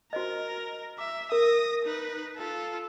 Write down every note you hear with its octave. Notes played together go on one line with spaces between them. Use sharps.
F#4 A#4 C5 D#5
E5 D6
A#4 D#6 A#6
D#4 B4
F4 A4